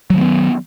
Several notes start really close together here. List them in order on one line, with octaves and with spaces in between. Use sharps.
F#3 D#3 A#3 B3